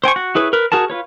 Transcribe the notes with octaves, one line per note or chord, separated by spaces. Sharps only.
C5 G5 G#5 C#6
F#4
E4 G#4 B4 C#5
A#4 B4
F#4 G#4 A#4 A5
F4 B4 C#5